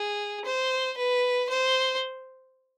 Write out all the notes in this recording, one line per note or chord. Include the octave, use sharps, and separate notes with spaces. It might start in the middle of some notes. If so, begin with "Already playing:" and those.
Already playing: G#4
C5
B4
C5